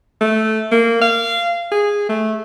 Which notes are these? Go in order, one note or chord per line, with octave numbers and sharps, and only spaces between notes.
A3
A#3
F5
G#4
A3